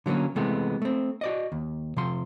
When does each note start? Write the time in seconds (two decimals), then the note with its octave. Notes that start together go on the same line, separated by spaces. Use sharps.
0.06 D3 F#3 G3 A#3 C#4
0.36 C3 E3 G#3 A3 B3
0.82 A3 C4
1.21 F#4 D5 D#5
1.52 D#2
1.97 C3 F3 C6